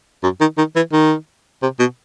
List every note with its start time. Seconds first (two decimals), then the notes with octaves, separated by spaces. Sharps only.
0.23 F#2
0.41 D#3
0.58 D#3
0.76 E3
0.93 D#3
1.62 C3
1.80 B2